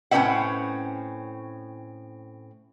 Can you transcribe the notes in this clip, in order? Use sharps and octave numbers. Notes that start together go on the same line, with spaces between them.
A2 C4 C#4 B4 E5 F#5